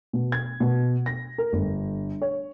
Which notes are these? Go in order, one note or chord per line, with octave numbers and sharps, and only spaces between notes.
B2
G#6
B2
A#6
A#4
G1
C#5